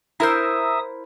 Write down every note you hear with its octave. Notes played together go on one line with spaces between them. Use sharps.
E4 A#4 C5 E5 A#5 D#6 E6